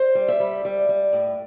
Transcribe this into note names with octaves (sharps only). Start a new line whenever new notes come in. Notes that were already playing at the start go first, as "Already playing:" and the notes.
Already playing: C5
G3
E5
G3
G3
G3
A2